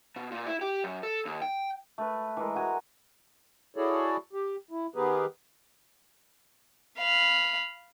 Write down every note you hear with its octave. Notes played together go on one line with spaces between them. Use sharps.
B2
A#2
E4
G4
F#2
A4
D#2
G5
A3 B4
E3 G#3 A#4
F#4 G#5 A#5
E4 F#4 G#4 A4 C#5 D5
G4
E4
D#3 B3 G4 G#4 A#4 B4
F5 B5